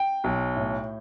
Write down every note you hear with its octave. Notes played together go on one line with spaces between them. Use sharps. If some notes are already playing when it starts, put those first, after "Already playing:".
Already playing: G5
B1
A2